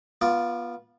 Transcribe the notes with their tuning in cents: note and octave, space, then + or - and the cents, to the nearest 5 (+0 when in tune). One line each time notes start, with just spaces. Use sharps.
B3 -25 F4 +0 D5 +0